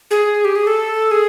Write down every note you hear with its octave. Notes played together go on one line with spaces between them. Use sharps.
G#4
G4
G#4
A4
G#4